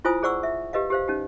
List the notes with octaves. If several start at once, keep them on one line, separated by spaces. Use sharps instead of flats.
E4 F4 C5 G#5 D#6
G#4 C5 D5 F#5 C#6 E6
E5
G4 B4 D#5 F5
G4 C5 F5
C#4 D#4 G4